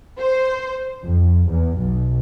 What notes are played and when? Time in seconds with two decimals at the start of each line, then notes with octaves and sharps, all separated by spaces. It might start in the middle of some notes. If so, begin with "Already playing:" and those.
0.20 C5
1.04 F2
1.49 E2
1.77 B1